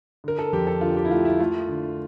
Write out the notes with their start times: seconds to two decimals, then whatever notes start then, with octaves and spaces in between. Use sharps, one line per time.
0.24 D3 A#4
0.38 A4
0.53 F2 G4
0.67 A4
0.81 D3 F4
0.96 G4
1.05 E4
1.11 A3 F4
1.25 E4
1.40 A3 F4
1.69 D3